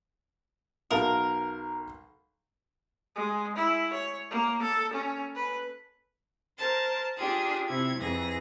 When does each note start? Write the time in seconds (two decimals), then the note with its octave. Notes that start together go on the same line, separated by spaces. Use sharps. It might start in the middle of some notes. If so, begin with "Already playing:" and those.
0.91 B1 A#4 F5 A5
3.16 G#3
3.57 E4
3.94 C#5
4.31 A#3
4.63 A4
4.94 C#4
5.36 B4
6.57 A#4 C5 A5
7.16 D4 F4 G4 G#4
7.67 C3 E4 G#6
7.97 F2 E3 G#4 A#6